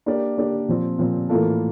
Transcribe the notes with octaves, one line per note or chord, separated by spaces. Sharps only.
A#3 D4 G4 D5
A#3 D4 G4 D5
A#2 F3 C4
A#2 F3 C4
A2 E3 A#3 F4 A4